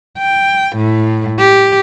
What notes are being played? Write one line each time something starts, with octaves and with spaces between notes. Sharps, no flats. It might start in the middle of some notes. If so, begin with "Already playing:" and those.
G5
A2
G4